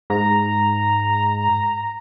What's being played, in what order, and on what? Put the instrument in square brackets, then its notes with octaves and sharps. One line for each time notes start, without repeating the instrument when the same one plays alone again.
[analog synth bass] G#2 [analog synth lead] A#5